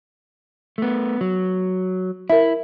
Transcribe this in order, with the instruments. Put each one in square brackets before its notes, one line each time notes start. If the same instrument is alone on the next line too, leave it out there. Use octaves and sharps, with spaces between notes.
[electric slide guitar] A3 B3
F#3
[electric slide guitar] E4 [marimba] A#4 E5